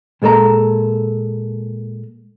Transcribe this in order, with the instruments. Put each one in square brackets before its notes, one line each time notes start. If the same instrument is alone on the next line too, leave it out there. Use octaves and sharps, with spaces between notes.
[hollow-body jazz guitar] A#2 G#3 A4 C#5 A#5